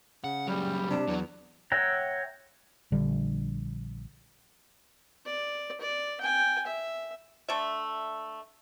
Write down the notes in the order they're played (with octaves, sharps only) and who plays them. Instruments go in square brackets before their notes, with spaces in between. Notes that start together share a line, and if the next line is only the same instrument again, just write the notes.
[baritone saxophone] C#3 [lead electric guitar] F#5
[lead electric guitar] C#2 F#3 [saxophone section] G3
[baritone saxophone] C3 [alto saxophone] D4
[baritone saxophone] E2 [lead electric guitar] F#3
[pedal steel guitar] C#5 E5 F#5 G5 A#5
[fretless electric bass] A#1 D3 G3
[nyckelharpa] D5
D5
G5 G#5
E5
[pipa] D3 A3 D5 E5